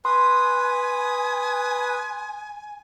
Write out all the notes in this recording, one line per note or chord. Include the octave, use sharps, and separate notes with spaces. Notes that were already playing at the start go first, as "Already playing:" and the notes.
B4 G#5 C6 D#6